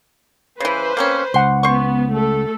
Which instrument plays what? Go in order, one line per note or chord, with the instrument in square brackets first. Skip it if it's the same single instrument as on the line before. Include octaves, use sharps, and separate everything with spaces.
[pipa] C#3 E3 [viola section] B4 C5
[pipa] A#3 C4 C#4
[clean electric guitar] C#2 F#5 [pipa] C6
[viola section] B3 [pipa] C5 C#6
[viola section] A3 A4